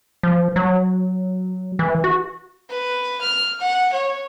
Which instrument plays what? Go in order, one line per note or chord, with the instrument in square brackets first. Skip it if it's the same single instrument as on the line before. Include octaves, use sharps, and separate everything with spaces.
[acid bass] F3
F#3
E3
F#4
[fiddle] B4
F6
F#5
C#5